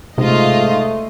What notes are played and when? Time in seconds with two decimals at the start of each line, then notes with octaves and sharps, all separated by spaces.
0.18 G#2 C3 A3 F4 D#5